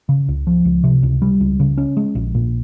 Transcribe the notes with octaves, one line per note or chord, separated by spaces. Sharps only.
C#3
C#2
F3
C#2
C3
C#2
G3
C#2
C#3
C#4
G#3
A#1
A#2